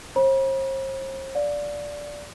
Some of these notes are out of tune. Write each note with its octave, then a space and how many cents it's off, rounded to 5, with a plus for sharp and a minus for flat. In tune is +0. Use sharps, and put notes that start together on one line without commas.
C5 +40 B5 -45
D5 -10 F5 +25